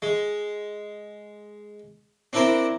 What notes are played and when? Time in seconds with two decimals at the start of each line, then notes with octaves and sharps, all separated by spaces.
0.02 G#3
2.33 C4 D4 E4 A#4 C5